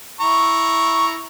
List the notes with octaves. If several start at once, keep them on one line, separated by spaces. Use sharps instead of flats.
E4 A#5 C#6